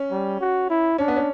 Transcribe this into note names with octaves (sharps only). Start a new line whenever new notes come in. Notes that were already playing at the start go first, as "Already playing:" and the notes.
Already playing: C#4
G3
F#4
E4
C#4 D4
B3
C#4